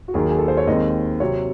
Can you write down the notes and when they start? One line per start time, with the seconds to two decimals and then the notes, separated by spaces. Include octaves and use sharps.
0.08 F#4
0.14 D#2 D#3 F#3 G#4
0.29 G#4
0.38 A4
0.48 C5
0.57 C#5
0.67 D#2 D#3 G#3 C4 D#5
1.20 C3 F#3 C4 C#5